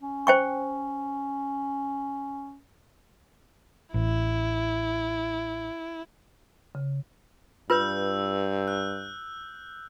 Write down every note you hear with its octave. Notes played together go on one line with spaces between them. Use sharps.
C#4
C5 G5 C#6
A1 E4
C#3
G2 F4 B4 E6 G6
F#6